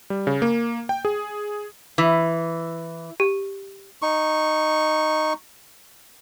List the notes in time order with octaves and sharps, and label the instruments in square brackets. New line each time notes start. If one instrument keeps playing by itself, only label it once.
[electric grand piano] G3
C#3
A#3
G5
G#4
[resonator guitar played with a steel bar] E3
[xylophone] G4
[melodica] D#4 C#6